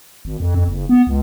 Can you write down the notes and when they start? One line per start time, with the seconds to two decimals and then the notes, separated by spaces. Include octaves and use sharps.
0.25 G#1
0.40 F2
0.55 F2
0.68 F#1
0.89 B3
1.07 C#2